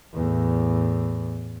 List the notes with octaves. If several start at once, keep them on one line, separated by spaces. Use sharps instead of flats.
E2 A2